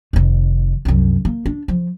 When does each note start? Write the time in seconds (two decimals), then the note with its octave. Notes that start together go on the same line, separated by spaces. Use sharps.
0.13 F1 D#3
0.85 C2 F#2
1.25 A#3
1.46 D4
1.68 F3